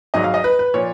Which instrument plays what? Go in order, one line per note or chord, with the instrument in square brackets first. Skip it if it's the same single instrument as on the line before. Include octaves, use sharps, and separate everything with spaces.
[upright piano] G#1 G#2 F#3 D#5
F5
D#5
B4
B4
A#2 F3 C#5